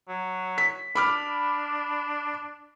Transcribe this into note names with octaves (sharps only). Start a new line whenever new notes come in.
F#3
B6
D4 B5 D6 F6